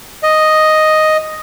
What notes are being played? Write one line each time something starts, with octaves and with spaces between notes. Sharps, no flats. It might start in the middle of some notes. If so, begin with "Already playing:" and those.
D#5